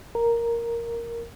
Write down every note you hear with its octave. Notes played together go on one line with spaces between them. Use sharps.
A#4